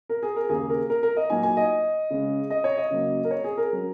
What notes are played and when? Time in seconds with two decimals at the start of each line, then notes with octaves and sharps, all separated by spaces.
0.09 A#4
0.23 G#4
0.36 A#4
0.49 D#2 C#3 A#3 G#4
0.69 A#4
0.90 A#4
1.03 A#4
1.16 D#5
1.30 A#2 F#3 A#3 D#4 G#5
1.43 G#5
1.57 D#5
2.10 C#3 G#3 C#4
2.50 D#5
2.64 C#5
2.77 D#5
2.90 C#3 F#3 A#3
3.24 A#4
3.31 C#5
3.44 G#4
3.57 A#4
3.73 F#3 C#4